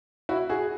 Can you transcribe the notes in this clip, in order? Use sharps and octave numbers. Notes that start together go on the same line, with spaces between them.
E4 F#4
F#4 G#4